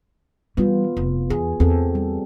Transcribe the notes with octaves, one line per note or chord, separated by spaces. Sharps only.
E3 G3 B3 F4
F1
E2 G#4
E2 C4 G#4 A4
G3